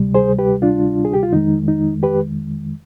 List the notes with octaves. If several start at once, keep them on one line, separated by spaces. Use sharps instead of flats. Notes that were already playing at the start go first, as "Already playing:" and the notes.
Already playing: D2 C3 G3
G#4 C5
G4 B4
D4 F4
G#4
G4
F4
F2 D#3 G#3 D#4
D#4
G4 B4